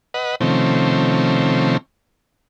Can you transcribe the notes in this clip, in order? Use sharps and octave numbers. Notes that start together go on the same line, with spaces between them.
B4 D#5 F#5
C3 D#3 F3 A3 C4 C#4